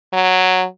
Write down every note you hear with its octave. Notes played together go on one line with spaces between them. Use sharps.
F#3